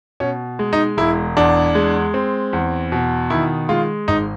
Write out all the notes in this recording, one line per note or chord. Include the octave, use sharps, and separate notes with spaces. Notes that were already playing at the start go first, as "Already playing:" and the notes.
B2 C#4
G#3
D#4
E1 E4
E2 D4
G#3
C4
E2
B2
D#3 E4
G#3 F4
G#1 D#4